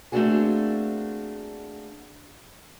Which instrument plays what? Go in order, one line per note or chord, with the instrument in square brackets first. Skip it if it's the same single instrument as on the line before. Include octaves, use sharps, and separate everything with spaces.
[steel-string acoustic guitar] A3 A#3 C4 D4 F#4 G#4